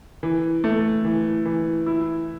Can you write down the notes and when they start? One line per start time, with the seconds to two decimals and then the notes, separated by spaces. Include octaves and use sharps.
0.23 E3
0.64 A3
1.05 E3
1.45 E3
1.86 E4